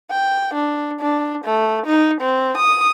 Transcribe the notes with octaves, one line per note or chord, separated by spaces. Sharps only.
G5
D4
D4
A3
D#4
C4
D#6